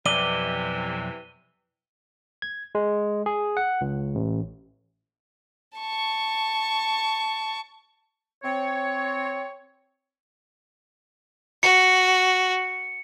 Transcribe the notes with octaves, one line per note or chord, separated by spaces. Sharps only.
B1 F2 C3 E3 D5 D#7 G7
G#6
G#3
G#4
F#5
C#2
A1
A5 C#6
C4 C#5
F#4 C#7